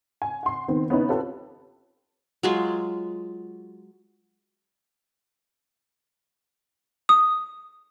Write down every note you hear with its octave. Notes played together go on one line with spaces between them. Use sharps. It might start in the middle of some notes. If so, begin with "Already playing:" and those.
G#5
F#5 C6
D#3 B3 C4
B3 C#4 D#4 E4 B4
C4 F4 G4 A4 B4 C#5
F#3 G#3 F4
D#6